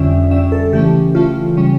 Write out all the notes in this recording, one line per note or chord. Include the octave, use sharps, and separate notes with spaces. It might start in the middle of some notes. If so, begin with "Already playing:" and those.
Already playing: F2 D3 G3 C#4 E5
F2 D3 G3 C#4 E5
A4
C#3 E3 A3 C#4 G4
C#3 E3 A3 C#4 F4
C#3 G3 C#4